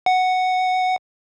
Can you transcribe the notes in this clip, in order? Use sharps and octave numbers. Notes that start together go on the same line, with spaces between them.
F#5